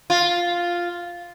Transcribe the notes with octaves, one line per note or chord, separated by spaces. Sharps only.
F4